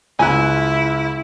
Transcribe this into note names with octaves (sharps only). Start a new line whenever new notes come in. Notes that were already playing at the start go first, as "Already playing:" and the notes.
C#2 E4 F4 G#5 F#6